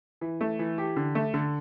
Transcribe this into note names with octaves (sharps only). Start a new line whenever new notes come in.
E3
A3
E3
G4
D3
A3
D3